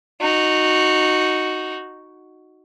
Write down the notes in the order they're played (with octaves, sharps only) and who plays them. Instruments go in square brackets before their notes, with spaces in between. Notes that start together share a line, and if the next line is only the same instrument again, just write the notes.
[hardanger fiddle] D#4 F#4